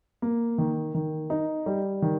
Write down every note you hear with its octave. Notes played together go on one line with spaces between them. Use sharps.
A#3
D#3
D#3
D#4
G3
D#3